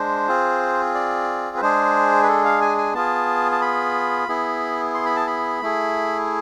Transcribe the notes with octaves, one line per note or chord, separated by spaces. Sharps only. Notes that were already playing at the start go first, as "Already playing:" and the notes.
Already playing: G#3 D4 C5
C4 F4 G#4
D5
B4
G#3 D4 G#4 C5
B4
A4
F5
G#5
G#5
B3 F4 G#4 A5
A5
B5
B3 E4 G#4
C6
B5
A5
B5
A3 E4 G#4